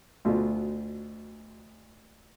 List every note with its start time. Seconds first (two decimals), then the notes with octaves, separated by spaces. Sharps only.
0.25 D2 B2 F4